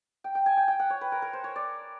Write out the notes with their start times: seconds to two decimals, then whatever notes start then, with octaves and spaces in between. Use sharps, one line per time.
0.24 G5
0.35 G5
0.46 G#5
0.57 G5
0.68 G5
0.79 F#5
0.90 C#5
1.01 B4
1.12 A#4
1.22 A#4
1.33 C5
1.44 C#5
1.56 D5